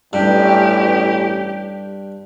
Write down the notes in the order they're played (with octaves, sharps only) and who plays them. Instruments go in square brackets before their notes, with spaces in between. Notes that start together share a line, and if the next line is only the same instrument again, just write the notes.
[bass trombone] A1 [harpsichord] G2 [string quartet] G4